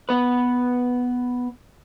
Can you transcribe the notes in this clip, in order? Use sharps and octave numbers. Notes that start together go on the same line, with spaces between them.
B3 B4